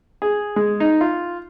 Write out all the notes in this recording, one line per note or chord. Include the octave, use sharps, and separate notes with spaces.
G#4
G#3
D#4
F4